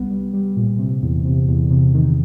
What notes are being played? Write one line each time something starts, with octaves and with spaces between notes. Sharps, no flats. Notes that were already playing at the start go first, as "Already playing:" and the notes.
Already playing: C2 G3 B3
G3
G3
A#2
C3
E2
C3
E2
C3
D#3